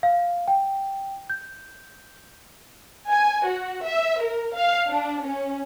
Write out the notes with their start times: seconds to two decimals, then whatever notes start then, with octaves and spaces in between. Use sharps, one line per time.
0.03 F5
0.48 G5
1.30 G6
3.11 G#5
3.45 F#4
3.84 E5
4.22 A#4
4.55 F5
4.89 D4
5.23 C#4